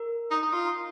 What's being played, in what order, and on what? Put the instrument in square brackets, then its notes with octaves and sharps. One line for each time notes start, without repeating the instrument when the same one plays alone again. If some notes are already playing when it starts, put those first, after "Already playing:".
Already playing: [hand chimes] A#4
[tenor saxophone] D#4
D#4
F4